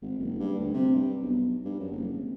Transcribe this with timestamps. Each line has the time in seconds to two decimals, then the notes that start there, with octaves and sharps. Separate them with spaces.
0.02 G#1
0.18 F#1
0.40 G2
0.60 D2
0.74 C3
0.95 G2
1.22 B1
1.65 G2
1.80 F#2
1.91 F#1
2.12 G#1